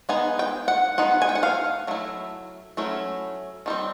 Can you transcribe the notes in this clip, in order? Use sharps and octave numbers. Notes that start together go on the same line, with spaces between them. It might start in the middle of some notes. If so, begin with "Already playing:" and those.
G#3 B3 D#4 G#5
G5
F#5
G#3 B3 D#4 F#5
G#5
G5
F#5
F5
F#3 A3 E4
F#3 A3 C#4 E4
D#3 G3 C4